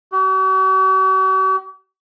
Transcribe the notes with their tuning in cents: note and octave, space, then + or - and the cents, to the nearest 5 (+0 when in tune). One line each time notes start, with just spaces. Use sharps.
F#4 +45